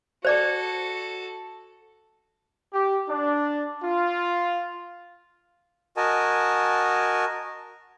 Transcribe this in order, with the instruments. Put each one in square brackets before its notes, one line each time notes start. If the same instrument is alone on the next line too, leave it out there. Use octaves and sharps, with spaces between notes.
[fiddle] F#4 A4 [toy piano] C5 D5 D6
[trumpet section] G4
D4
F4
[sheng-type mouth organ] F#4 A#4 D#5 G#5 A5